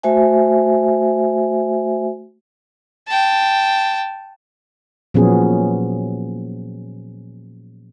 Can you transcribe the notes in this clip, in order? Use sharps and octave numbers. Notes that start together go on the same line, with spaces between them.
A3 F#4 C5 E5 G#5
G5 A5
A#2 F3 F#3 B3 C#4 G#4